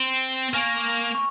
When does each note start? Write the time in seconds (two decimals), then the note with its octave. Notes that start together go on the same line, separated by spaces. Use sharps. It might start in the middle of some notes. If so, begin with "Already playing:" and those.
Already playing: C4
0.53 A#3 G#5 C#6 F6
1.15 C#6